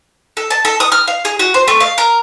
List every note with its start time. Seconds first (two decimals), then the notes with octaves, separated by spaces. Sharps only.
0.37 A4
0.50 A5
0.65 A4
0.80 D#6
0.92 F6
1.08 F5
1.25 G#4
1.39 F#4
1.54 C5
1.68 A3
1.80 F5
1.98 A#4